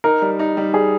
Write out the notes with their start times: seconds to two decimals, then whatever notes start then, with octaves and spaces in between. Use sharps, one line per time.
0.04 D#4 A#4
0.22 G3
0.39 D#4
0.57 G3
0.73 G3 G#4